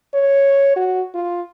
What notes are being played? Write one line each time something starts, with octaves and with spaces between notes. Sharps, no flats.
C#5
F#4
F4